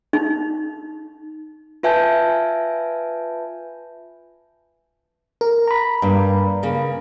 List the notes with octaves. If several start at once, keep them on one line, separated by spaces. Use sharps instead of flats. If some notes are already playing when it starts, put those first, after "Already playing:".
D#4
F4 B4 E5 G#5 A5 G6
A#4
A#5 B5
G2 A#3
C#3 A#3